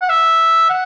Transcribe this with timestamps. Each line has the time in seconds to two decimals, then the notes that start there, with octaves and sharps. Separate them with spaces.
0.02 F#5
0.09 E5
0.69 F#5